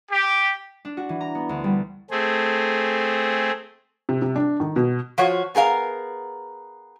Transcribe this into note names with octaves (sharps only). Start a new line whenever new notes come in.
G4
D4
F#4
E3
A#5
B3
D2
G3
A3 C4 G#4
C3
C3
D4
D#3
B2
F3 F4 F#4 C#5
B3 G#4 A#4 F5